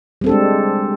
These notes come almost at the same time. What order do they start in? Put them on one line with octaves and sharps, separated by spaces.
G3 C4 A4 D4 G#3